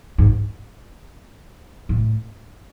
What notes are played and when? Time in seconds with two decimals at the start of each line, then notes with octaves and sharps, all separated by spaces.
0.18 G#2
1.89 A2